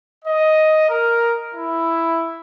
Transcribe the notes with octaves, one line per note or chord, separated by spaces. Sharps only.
D#5
A#4
E4